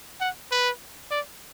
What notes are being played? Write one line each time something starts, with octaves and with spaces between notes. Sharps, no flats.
F#5
B4
D5